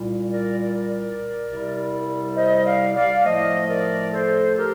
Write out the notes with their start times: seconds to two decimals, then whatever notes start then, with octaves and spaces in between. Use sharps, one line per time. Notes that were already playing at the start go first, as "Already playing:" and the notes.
Already playing: C2 A#2 G3
0.30 A#4 D5
0.61 A#4 D5
1.48 C2 C3 G3
2.36 C5 D#5
2.65 D5 F5
2.95 D5 F5
3.24 A2 F3 A3 C5 D#5
3.69 A#4 D5
4.12 A4 C5
4.57 G4 A#4